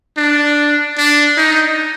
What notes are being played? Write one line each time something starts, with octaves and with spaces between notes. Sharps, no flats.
D4
D4
D#4